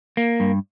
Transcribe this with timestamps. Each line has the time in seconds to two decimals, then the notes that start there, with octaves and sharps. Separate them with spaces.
0.17 A#3
0.40 G2